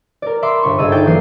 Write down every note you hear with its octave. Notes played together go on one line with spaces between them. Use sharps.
A#4 D5
E5 B5 C6 D6
G1 C#6
G1 G#4 A4 D#5 E6 D#7
D#4 D5 G5 D6 A6
E3 F#3 A#3 D#6 C7